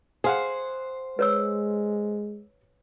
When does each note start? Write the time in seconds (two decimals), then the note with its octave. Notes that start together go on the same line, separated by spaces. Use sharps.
0.24 G#4 C5 F5 F#5
1.19 G#3 B4 C#5 E6